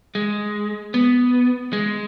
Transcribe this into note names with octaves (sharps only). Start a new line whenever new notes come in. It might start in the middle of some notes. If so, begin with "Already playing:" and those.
G#3
B3
G#3